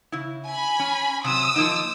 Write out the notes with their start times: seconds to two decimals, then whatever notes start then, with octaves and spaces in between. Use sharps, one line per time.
0.12 C#3 E4
0.47 G#5 B5
0.80 C#4
1.24 C3 F#3 D#6 E6
1.56 F3 A#3 D#4